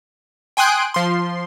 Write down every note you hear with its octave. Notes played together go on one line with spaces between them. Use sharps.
G5 G#5 C6 D#6 F#6 D7
F3 C6